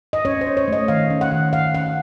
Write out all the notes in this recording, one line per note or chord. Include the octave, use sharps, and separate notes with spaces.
D#5
C#4 C#5
C5
C#4
C#5
A3 D#5
D#3 F5
C#4
F#5
D#3
D#3 F5
C#4 F#5